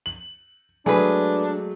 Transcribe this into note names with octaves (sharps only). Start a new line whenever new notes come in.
F#7
F#3 G#3 A3 D4 G#4 B4